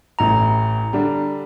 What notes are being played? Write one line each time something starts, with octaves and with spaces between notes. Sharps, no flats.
A1 A2 E3 A#5
D3 G3 D4